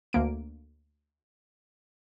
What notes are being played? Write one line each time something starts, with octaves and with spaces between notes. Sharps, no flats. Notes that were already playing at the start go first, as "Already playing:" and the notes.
D2 A#3 D7